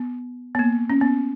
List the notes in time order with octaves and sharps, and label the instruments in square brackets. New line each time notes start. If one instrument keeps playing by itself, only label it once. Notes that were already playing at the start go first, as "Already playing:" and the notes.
Already playing: [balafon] B3
B3
A#3
C#4
B3